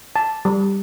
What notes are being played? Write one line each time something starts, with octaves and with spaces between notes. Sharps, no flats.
A5
G3